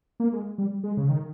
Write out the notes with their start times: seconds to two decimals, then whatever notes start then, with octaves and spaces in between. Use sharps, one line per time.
0.20 A#3
0.33 G#3
0.58 G3
0.84 G#3
0.97 C#3
1.09 D#3